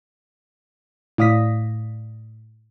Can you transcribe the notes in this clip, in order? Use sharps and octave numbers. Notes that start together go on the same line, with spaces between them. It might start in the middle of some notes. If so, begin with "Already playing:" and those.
A2 D5 F5 D#6 A#6 B6